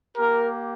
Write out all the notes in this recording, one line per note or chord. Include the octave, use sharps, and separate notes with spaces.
A#3 G4 A#4